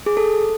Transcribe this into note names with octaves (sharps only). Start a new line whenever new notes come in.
G#4
A4